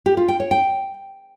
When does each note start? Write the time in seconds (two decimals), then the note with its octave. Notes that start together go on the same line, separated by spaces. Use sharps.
0.06 G4
0.17 F4
0.28 G5
0.40 C#5
0.51 G5